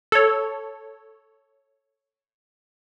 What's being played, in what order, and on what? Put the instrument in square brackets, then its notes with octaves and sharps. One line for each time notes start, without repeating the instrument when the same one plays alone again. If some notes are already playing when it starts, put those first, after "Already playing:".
[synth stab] A4 C#5